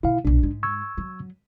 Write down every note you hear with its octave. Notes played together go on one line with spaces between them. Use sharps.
B2 D3 E4 F5
B1 A#2 D4
G#2 G#3
C#6 E6 G#6
F#3